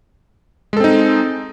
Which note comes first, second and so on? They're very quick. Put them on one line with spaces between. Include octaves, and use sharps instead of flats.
G#3 A4 C4 D#4